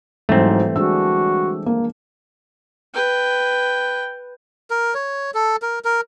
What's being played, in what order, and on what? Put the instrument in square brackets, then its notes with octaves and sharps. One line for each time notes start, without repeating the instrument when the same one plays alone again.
[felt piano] G#2 F#3 [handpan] E3 G3 [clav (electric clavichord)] A3 C4
[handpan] G#3 D4 G#4 [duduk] F#4 [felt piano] E6
[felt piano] A#3
[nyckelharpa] B4 G5
[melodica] A#4
C#5
A4
A#4
A#4